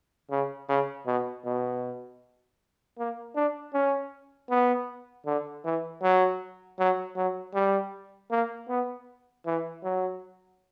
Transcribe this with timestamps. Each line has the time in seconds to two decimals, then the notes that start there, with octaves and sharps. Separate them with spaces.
0.30 C#3
0.69 C#3
1.06 B2
1.45 B2
2.98 A#3
3.35 D4
3.74 C#4
4.50 B3
5.26 D3
5.64 E3
6.02 F#3
6.79 F#3
7.16 F#3
7.54 G3
8.31 A#3
8.69 B3
9.46 E3
9.83 F#3